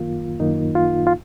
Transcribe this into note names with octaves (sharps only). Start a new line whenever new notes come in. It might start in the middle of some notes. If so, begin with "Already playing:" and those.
Already playing: F#2 D#3 A#3 F4
F#2 D#3 A#3 D#4
F4
F4